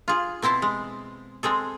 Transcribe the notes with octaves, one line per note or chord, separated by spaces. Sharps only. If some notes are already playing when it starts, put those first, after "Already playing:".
F4 G#4
B2 C4 E4 C5 A5
G#3
G#3 C4 G#4 A4